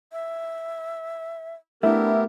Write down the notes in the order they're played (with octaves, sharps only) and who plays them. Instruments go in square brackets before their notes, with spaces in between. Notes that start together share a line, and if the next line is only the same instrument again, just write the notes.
[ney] E5
[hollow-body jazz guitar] A3 [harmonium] B3 G4 A#4 [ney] D4 [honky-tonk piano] E4